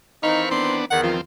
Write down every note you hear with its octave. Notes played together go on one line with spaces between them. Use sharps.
D#3 E3 C4 D#4 F5 B5 C#6
B3 D4 C6
E2 D#3 F#5
F3 C4 F4